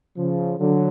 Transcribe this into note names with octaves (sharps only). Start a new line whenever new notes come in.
C#3 F3
D3 F#3